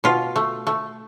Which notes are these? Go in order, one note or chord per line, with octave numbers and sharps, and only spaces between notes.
B2 F4
A3
A3